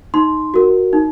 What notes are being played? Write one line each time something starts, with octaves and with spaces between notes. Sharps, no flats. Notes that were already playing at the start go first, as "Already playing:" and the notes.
D#4 C6
F#4 A#4
D#4